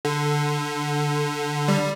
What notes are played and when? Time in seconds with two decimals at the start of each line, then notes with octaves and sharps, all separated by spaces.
0.05 D3
1.68 G3